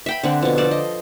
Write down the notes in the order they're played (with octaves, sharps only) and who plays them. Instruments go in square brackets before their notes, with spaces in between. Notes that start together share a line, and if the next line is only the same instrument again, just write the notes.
[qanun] E5 G5 B5
D3 C4 F#5
B2 F3
A4 C5 D5
D#5